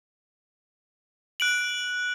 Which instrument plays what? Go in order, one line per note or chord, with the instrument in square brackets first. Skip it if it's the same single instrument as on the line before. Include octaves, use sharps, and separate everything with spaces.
[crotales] F#6 D7 F#7